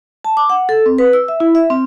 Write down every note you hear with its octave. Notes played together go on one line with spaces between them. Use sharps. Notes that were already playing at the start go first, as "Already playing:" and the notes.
A5
D6
F#5
A4
C4
B4
E6
E5
E4
E5
C4